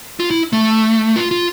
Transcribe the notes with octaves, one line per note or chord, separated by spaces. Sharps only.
F4
E4
A3
F4
F4